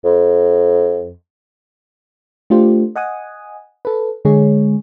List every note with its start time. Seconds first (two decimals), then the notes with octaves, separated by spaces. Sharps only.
0.05 F2
2.50 A3 D4 F4 G4 C5
2.96 D#5 F#5 G#5 D#6
3.85 A4 B4
4.25 D3 G#3 G#4 C#5